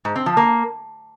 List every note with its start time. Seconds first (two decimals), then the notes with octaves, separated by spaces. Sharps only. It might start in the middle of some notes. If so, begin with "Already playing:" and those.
0.05 G#2
0.16 C4
0.26 F3
0.37 A#3